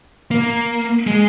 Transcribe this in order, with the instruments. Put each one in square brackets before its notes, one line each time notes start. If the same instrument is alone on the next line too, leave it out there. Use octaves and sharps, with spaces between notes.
[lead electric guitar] A#3
G#3